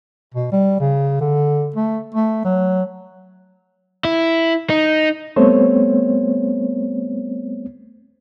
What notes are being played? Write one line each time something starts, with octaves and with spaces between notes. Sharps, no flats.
B2
G3
C#3
D3
A3
A3
F#3
E4
D#4
G3 A3 B3 C4 C5 C#5